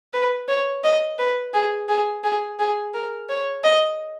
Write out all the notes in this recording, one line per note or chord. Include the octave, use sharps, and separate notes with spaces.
B4
C#5
D#5
B4
G#4
G#4
G#4
G#4
A#4
C#5
D#5